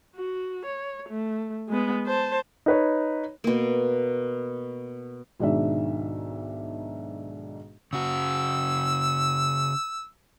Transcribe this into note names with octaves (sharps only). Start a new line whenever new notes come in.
F#4
C#5
A3
G#3 B3
C5 A5
D#4 B4 C#5
B2 A#3
B1 G#2 D#3 D4 E5
C#3 F#4 E6